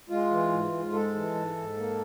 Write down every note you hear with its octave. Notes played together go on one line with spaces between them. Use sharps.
G#3 F4
E3
G#2
G#2
G#3 A4
E3
G#2
G#2
A#3